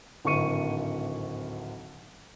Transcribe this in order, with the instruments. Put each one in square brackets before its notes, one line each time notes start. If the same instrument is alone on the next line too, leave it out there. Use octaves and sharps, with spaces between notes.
[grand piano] D1 G#1 D2 C#6 C#7 D#7